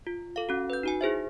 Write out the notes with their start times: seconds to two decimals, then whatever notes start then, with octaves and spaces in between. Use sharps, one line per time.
0.07 F4
0.36 A4 F5
0.49 C#4 F#4
0.70 B4 G6
0.83 D#4 F#4 G#5
1.01 E4 G#4 C5 E5